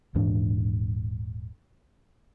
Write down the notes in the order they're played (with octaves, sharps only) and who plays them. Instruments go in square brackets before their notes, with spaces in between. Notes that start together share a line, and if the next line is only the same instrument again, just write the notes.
[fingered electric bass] D#1 G#2 E3 D4